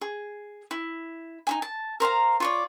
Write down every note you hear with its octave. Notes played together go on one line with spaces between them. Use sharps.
G#4
E4
D#4 E4 G#5
A5
A#4 C5 F5 A#5
F4 C#5 D5